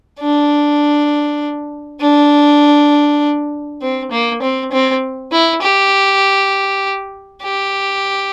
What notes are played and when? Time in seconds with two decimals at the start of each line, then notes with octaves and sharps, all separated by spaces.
0.20 D4
2.01 D4
3.82 C4
4.11 A#3
4.42 C4
4.72 C4
5.32 E4
5.62 G4
7.43 G4